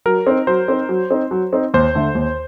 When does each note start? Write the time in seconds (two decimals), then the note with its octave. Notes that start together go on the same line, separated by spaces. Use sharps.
0.06 F#3 A#4
0.27 C4 D#4
0.47 F#3 C5
0.68 C4 D#4
0.89 F#3
1.11 C4 D#4
1.31 F#3
1.53 C4 D#4
1.74 D#2 C5
1.95 D3 A3
2.15 D#2